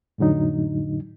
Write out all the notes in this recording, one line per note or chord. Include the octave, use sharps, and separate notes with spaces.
F2 A2 D3 F#3 D#4